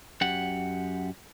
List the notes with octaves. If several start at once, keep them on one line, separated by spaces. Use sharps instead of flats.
F#2 G4 F#5